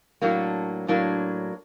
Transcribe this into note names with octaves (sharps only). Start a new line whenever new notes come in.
A2 F#3 A#3 D4
A2 F#3 A#3 D4